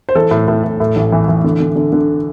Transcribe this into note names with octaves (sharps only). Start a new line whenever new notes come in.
C5
E3 A4
A2
A2
A2
A2
A1
E3
E3
D3
D3
D3
D3